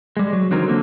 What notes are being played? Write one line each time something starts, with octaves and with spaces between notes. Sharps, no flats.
G3 G#3
F#3
D3 F3 F#3 C4 D#4 A#4
D3 A#3 A4